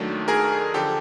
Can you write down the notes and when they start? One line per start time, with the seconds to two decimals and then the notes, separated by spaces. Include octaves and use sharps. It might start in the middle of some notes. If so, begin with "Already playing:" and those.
Already playing: D#2 D#3 F#3 A3 D4
0.28 G#4 A#4
0.74 D3 F3 G4 A4